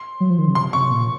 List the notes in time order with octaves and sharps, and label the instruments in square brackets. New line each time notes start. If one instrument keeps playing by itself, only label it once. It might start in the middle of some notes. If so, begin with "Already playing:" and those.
Already playing: [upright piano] C6
[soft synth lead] F#3
F3
D#3
C#3
[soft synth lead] C3 [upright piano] C6
[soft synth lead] C3 [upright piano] C#6
[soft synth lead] A#2